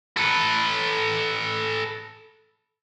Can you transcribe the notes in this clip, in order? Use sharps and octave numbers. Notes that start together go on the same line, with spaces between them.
A4 B4